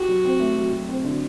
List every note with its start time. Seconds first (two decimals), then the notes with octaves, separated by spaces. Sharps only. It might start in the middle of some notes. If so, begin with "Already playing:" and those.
Already playing: F#4 G4
0.08 F#3
0.24 C4
0.40 A3
0.56 F#3
0.72 F#3
0.89 C4
1.04 D3